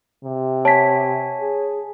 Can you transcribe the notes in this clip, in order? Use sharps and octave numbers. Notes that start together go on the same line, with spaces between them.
C3
C#5 G#5 A5 B6
G#4